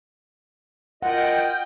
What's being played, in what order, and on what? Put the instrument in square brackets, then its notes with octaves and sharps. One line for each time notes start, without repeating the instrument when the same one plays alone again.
[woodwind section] F4 A#4 D#5 [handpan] F#5 [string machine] G5